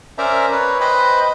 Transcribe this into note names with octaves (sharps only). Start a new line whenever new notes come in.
C#4 A#4 C5 D5 E5 A#5
B4 C#5
B4 C5 D#5 G5 B5